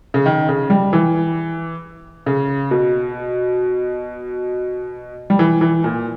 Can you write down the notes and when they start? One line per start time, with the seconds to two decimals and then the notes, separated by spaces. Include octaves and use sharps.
0.14 C#3
0.26 D#3
0.49 C#3
0.70 G3
0.93 E3
2.26 C#3
2.71 B2
5.30 G3
5.39 E3
5.61 E3
5.84 A#2